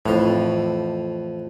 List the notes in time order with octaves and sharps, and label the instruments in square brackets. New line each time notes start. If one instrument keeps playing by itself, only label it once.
[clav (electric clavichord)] F2 A2 [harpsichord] E3 F3